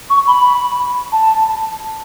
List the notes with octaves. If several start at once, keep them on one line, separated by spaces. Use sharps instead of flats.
C#6
B5
A5